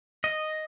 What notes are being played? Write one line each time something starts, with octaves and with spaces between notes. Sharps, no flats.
D#5